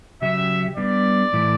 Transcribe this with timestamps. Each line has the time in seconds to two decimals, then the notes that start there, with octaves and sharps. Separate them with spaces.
0.22 C#3 F#3 C#4 G4 E5
0.77 G3 B3 D4 D5
1.33 A2 E3 A3 E4